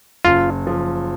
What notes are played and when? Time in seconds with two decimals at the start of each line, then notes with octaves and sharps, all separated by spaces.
0.25 F#1 F4
0.67 F3